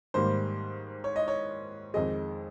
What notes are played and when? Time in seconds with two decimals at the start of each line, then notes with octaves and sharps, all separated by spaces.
0.14 G#2 D#3 G3 A#3 C5
1.04 C#5
1.16 D#5
1.28 C#5
1.94 F2 D#3 G#3 D#5